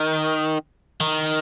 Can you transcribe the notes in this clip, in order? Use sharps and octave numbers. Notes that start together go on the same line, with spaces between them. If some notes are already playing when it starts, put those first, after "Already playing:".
Already playing: D#3
D#3